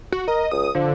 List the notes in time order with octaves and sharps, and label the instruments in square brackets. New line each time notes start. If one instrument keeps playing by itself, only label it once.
[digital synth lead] F#4
[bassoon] A#4 [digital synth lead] D#5
[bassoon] C#2 [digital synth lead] D#6
[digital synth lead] D3 [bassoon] F3